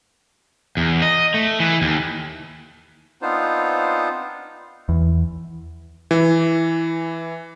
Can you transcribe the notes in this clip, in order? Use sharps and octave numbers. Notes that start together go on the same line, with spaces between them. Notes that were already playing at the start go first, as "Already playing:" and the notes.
E2
D#5
A3
E3
D#2
B3 C4 D4 D#4 F4 C5
E2
E3